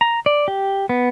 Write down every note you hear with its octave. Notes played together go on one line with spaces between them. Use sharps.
A#5
D5
G4
B3